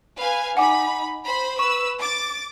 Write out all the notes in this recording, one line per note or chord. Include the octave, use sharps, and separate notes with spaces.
B4 F5 G#5
D#4 F#5 G#5 B5 D6
C5 B5
B4 C#6 E6
D6 A6